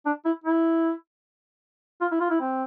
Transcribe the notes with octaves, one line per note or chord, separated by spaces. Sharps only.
D4
E4
E4
F4
E4
F4
E4
C4